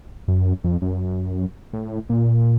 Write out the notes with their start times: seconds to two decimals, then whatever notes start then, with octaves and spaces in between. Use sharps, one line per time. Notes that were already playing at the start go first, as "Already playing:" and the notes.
0.28 F#2
0.64 F2
0.82 F#2
1.73 A2
2.10 A#2